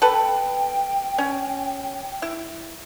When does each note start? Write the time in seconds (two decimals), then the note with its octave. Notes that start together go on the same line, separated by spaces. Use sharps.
0.02 A4 B4 G5
1.18 C#4
2.22 E4